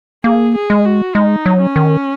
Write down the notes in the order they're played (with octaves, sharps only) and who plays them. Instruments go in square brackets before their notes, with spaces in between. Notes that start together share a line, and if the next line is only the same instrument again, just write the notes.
[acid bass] A#3 [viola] G#4
[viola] G#4
[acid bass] G#3
[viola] F#4
[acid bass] G#3 [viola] D#4
[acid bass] F#3
[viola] C#4
[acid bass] D#3